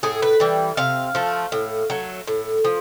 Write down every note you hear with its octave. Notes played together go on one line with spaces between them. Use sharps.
A2 G#4
B4
E3 G3
C3 F5
F3 A3
A2
F#3 A3
A2
F3